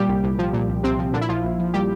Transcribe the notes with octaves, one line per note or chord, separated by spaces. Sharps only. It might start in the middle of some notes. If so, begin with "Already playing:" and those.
Already playing: A#2 G3 G4
C2
C2
F3
A#2
C2
C2 C3 C4
F3
A#2 D3 D4
E4
A#1 F3 F4
A#1
F3
A#2 G3 G4